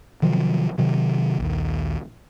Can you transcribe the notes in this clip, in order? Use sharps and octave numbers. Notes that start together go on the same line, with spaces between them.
C3 D#3 F3 F#3
C3 D#3 F#3
A#1 D#2